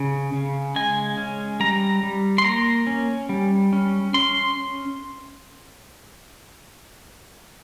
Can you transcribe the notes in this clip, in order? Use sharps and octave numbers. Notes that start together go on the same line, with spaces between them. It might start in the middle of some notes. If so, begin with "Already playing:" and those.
Already playing: C#3
C#3
G#3 G#5
C#4
G3 A#5
G3
C6
A#3 A#5
C#4
G3
C#4
C#4 C6